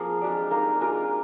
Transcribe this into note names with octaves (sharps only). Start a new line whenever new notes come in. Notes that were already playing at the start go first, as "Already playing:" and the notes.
Already playing: F3 A#3 C4 F4 G#4
G#3 D4 G4 D5
A#3 D#4 A#4 F5
G#3 D4 F4 A#4